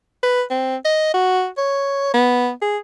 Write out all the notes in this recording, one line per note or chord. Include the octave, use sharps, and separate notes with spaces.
B4
C4
D#5
F#4
C#5
B3
G#4